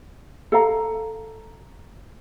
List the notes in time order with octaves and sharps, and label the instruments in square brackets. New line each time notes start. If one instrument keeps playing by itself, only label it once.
[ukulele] A4 F5 A#5